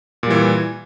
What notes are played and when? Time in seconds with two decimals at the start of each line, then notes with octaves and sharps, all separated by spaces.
0.23 A#2
0.27 G3
0.30 E3